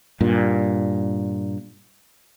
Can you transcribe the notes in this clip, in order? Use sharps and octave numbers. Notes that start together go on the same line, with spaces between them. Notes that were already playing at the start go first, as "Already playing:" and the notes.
G2 A#2